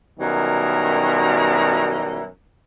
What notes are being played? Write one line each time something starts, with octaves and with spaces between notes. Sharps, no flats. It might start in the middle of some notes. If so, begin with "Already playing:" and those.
F#2 B2 D#3 G3 E4 A#5